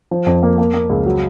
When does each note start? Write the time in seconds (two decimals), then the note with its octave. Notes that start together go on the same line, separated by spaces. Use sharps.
0.11 F3
0.26 F2
0.43 A#3
0.58 A#3
0.74 A#3
0.90 C#2
1.06 F#3